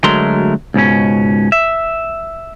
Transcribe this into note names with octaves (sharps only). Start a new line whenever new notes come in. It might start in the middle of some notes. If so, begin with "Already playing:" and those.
D2 F#3 G#3 A3 A#4 C6
C#2 G#2 B2 C#4
E5